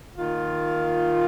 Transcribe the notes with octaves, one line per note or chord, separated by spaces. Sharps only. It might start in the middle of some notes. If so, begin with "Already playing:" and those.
D#3 A#3 F4